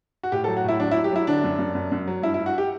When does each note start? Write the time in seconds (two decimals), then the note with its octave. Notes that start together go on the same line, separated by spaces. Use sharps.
0.23 F#4
0.32 A2 G4
0.44 A4
0.48 F#3
0.57 F#4
0.64 A2 E4
0.80 F#3 D4
0.91 E4
0.96 F#3
1.04 G4
1.12 F#3 E4
1.27 D3 D4
1.44 F#2
1.59 F#2
1.75 F#2
1.92 F#2
2.08 F#3
2.22 G2 E4
2.34 E4
2.39 G2
2.46 F#4
2.58 G4